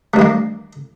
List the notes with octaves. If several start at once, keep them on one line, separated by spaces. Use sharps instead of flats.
G2 D#3 A3 A#3